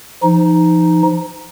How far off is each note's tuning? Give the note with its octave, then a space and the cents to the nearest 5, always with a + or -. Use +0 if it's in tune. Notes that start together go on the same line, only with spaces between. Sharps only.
F3 -35 D#4 +0